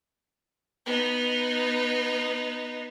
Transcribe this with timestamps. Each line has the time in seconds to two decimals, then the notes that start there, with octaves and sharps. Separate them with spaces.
0.86 B3 D#4